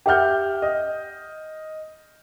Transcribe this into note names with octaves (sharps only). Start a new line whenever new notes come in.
G4 E5 F#5 F6 G6
D#5